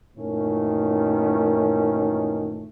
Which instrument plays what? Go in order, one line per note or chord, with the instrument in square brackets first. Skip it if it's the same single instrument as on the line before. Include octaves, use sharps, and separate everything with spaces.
[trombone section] F#2 A#2 D#3 E3 A3 C#4